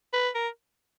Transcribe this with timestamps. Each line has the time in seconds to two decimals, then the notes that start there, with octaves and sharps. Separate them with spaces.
0.13 B4
0.35 A#4